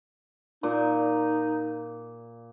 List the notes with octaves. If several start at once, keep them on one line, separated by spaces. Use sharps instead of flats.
A#2 D#4